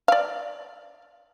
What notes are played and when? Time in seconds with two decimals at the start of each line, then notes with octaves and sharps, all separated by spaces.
0.08 D5 F5